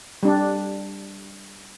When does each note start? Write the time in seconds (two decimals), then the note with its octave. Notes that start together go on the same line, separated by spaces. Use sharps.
0.23 G3 D4